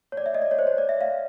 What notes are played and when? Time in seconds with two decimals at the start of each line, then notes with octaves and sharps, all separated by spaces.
0.12 C#5
0.17 D5
0.26 E5
0.35 D#5
0.42 D5
0.51 C#5
0.59 C5
0.67 C#5
0.78 D5
0.89 E5
1.01 F5